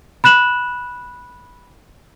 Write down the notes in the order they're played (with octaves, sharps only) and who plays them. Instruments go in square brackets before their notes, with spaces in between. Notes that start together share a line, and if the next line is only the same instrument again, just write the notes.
[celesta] B5 F#6 E7 F#7